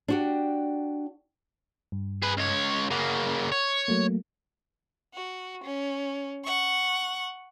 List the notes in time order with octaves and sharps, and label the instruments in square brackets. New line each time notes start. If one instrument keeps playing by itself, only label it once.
[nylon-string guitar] D4 F#4 G4
[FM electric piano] G2
[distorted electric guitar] G#4 B4
C#2 C#5
[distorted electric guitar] C#3 A#3 [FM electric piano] A#4 F#5
[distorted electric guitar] C#5
[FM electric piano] F#3 A3 A#3
[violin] F#4
C#4
F#5 C#6